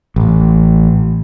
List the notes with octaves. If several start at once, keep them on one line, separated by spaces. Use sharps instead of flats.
A1